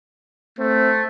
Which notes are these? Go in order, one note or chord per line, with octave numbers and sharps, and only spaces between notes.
A3 C4